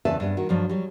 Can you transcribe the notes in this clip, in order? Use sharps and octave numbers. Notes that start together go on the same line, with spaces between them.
E2 C#3 B4 D5 E5 A5
G2 B3
D#3 F#4
G2 F3 F#3
F#3 G3